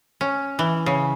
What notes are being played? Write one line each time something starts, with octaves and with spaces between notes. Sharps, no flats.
C#4
E3
C#3